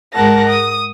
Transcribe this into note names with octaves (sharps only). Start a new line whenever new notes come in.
G#2 G#3 A#4 F#5 A5 A#6
D#6